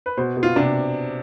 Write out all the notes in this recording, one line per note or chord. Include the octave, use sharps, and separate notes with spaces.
B4
B2 C5
B2
F4
C3 D4